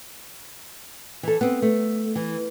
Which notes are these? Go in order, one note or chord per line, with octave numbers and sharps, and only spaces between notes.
E3 A4
B3 C4
A3
E3